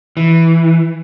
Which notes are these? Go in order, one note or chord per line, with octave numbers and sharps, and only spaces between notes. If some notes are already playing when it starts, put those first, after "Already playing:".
E3